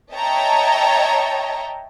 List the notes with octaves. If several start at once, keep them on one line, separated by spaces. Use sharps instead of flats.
C#5 D#5 E5 G5 A5 A#5